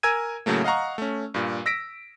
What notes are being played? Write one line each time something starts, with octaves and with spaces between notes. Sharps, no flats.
A#4 G#5 E6 G#6 D#7
A2 C#3 F#3 A3 A#3
D#5 F5 F#5 A#5 C#6
A3 C#4
G2 A#2
E6 A#6 B6 D7